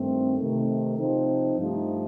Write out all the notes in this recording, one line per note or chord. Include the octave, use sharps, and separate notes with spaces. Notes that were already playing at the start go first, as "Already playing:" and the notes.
Already playing: G2 D#3 A3 C4
C3 D#3 A3
C3 F3 C4 D#4
G2 F3 A3 D#4 G4